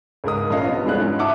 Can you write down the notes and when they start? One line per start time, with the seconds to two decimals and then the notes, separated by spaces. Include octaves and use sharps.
0.24 C#2 G#2 A#4 D#6
0.50 A#1 D3 C#4 F4 D#5 F5
0.66 C3 F3 B3
0.84 F1 G2 E3 G#3 B3 F#6
0.97 G#2 F3 C#4 D#4
1.19 E5 F#5 A5 D6 D#6